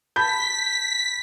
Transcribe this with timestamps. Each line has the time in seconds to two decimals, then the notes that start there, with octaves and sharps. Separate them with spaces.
0.16 A5 B5 G6 B6